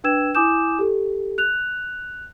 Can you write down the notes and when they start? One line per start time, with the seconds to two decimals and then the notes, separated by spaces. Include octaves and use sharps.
0.04 D4 B4 G5 E6 G#6 E7
0.35 E4 G#5 D6 D#6 G6 E7
0.79 G4 A4
1.38 F#6 F7